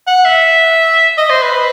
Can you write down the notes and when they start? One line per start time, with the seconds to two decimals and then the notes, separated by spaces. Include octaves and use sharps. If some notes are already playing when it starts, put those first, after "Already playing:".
0.07 F#5
0.25 E5
1.18 D#5
1.30 C5
1.42 B4